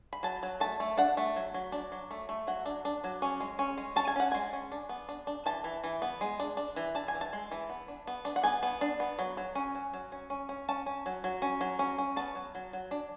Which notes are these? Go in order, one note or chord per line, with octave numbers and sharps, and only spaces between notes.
B5
F#3 A5
F#3
A3 A5
A3
D4 F#5
A3
F#3
F#3
D4
F#3
A3
A3
F#3 F#5
D4
D4
F#3
C#4
G#3
C#4
G#3
C#4 A5
G#5
C#4 F#5
G#3 G#5
C#4
D4
B3
D4
D4
E3 A5
E3
E3
B3
G#3
D4
D4
E3
D4 A5
G#5
E3
A5
G#3
E3
B3
D4
B3
D4
F#5
B3 G#5
B3
D4
B3
F#3
F#3
C#4
F#3
F#3
C#4
C#4
C#4
C#4 A5
C#4
F#3
F#3
C#4
F#3
C#4
C#4
B3 A5
F#3
F#3
F#3
D4